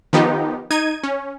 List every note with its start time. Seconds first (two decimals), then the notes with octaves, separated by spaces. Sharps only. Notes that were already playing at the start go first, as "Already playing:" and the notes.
0.13 D#3 F3 B3 D#4 G4
0.71 D#4 G#6 D#7
1.03 C#4